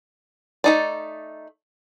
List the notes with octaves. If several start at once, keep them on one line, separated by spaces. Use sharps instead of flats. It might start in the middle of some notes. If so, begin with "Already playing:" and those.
A3 D#4 D5